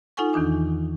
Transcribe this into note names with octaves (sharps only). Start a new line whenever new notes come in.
D#4 F4 A4 F#5 G#5 C#6
E2 D#3 E3 D4 D#6